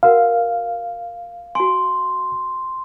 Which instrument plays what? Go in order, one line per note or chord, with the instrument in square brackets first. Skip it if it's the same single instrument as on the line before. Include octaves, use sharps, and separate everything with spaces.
[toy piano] F#4 A#4 F#5 [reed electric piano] F5
[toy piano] F#4 G#5 [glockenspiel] C6